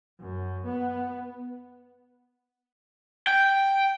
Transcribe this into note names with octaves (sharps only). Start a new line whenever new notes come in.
F#2
B3
G5